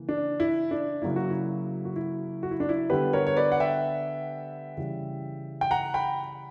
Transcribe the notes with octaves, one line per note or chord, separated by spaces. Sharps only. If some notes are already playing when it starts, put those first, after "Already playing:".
Already playing: C#3 E3 A#3
D4
E4
D4
C#3 F#3 A#3 E4
F#4
E4
F#4
E4
F#4
E4
D4
E4
D3 G3 B3 G4 B4
A#4 C#5
C#5
B4 D5
F#5
E5 G5
C#3 E3 G3
G5
F#5 A#5
G5 B5